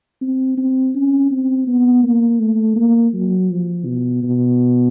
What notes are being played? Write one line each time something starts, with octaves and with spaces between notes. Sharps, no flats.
C4
C4
C#4
C4
B3
A#3
A3
A#3
F#3
F3
B2
B2